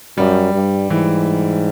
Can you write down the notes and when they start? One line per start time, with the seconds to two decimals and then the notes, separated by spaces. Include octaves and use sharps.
0.18 F#2 G3
0.54 G2
0.90 G#2 E3